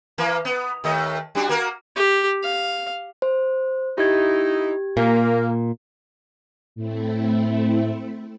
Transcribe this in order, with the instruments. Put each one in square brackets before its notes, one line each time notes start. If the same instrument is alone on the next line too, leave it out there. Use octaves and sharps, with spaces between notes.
[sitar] E3 A#3
B3
D#2 A3 D#5
G3 D4 F#4
A#3 F#4 A#4
[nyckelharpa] G4
F5
[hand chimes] C5
[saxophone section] D#4 E4 [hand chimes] G4 G#6
[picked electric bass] A#2 [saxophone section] A#3
[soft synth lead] A2 [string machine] A3 C4 E4